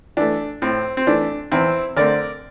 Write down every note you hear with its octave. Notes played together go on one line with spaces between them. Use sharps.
E3 A3 D4
A2 C4
C4
E3 A3 D4
E2 C4 E4
D3 A3 C4 A#4 D5